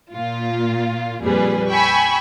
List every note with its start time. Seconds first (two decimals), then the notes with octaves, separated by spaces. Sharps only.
0.14 A#2 F4
1.21 F2 A#2 G3 G#4 B4
1.71 G5 G#5 B5 C#6 E6